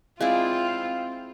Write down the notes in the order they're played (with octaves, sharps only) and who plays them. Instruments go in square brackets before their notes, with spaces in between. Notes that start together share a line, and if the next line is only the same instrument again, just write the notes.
[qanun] G#3 E4 D5 [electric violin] C4 [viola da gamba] F4 [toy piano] F5